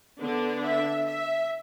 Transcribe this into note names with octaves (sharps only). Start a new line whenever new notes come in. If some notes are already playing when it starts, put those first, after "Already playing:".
D3 B3 D4
E5
E5